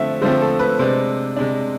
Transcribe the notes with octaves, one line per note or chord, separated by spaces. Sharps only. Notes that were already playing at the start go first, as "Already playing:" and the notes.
Already playing: D3 F3 A3 C4 E5
D3 F3 A3 C4 C5
A4
B4
C3 G#3 D4 C5
C3 G#3 D4